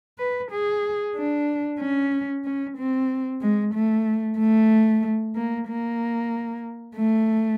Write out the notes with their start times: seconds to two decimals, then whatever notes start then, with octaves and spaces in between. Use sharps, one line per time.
0.19 B4
0.52 G#4
1.16 D4
1.80 C#4
2.45 C#4
2.78 C4
3.41 G#3
3.74 A3
4.38 A3
5.36 A#3
5.68 A#3
6.97 A3